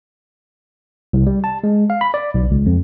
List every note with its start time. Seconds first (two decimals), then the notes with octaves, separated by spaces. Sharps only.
1.13 C2
1.27 G3
1.44 A5
1.64 G#3
1.90 F5
2.01 B5
2.14 D5
2.34 B1
2.51 C#2
2.66 F2